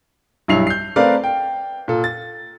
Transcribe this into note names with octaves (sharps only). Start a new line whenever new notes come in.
B1 G2 E4 C7 F7
G6 C7
A3 C4 A#4 B4 D5 F5
G5
A#2 A4
A6